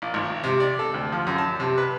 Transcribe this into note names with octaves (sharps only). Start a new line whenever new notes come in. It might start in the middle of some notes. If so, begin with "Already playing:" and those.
A#1
G#1
C3
D5
A4
D2
F3
F#2
A5
C3
B4